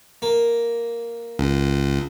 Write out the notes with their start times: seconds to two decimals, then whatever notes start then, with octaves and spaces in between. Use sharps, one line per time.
0.22 A#3
1.39 C#2